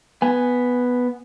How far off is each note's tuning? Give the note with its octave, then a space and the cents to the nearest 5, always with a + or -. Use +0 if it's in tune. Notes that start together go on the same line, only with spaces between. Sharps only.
B3 +0 G#5 +0